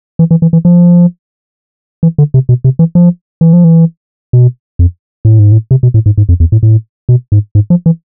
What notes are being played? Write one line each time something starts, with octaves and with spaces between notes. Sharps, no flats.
E3
E3
E3
E3
F3
E3
D3
C3
B2
C3
E3
F3
E3
F3
E3
B2
F2
A2
G#2
A2
C3
B2
A2
G#2
G#2
F2
E2
A2
A2
B2
G#2
G#2
F3
E3